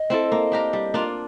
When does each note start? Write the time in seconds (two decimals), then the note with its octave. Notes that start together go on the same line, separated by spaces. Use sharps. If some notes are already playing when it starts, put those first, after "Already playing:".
Already playing: D#5
0.10 C4 E4 A4
0.32 A#3
0.52 D4 G4 A#4
0.73 G3
0.94 A#3 D4 F4